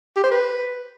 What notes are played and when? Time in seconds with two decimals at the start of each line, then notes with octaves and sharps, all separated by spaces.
0.16 G4
0.24 C5
0.31 B4